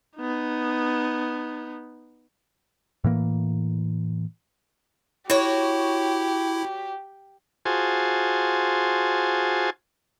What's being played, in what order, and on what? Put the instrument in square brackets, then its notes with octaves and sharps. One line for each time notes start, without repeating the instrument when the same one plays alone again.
[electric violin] B3 D#4
[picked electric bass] A2 E3 A#3
[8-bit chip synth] E4 [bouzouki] F#4 C#5 [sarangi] G4
[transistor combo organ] F4 F#4 G#4 C5 G#5 A5